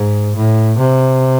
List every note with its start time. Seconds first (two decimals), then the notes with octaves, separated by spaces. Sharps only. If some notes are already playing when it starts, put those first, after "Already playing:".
Already playing: G#2
0.36 A2
0.78 C3